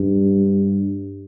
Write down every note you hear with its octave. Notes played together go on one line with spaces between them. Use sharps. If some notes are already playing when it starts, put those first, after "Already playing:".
Already playing: G2